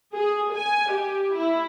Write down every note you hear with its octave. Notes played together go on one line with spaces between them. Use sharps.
G#4
G#5
G4
E4